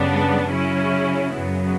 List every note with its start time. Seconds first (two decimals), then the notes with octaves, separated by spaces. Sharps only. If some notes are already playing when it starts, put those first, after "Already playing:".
Already playing: F#2 C#3 G3 B3 D4
0.50 C#3 F#3 C#4 E4
1.33 F#2 C#3 F#3 B3